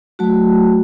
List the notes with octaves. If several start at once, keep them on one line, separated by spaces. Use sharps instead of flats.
F#3 A3 F#4 A5